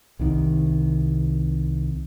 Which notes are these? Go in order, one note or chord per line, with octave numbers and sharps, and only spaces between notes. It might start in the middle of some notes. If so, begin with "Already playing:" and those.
C2 C3 D#3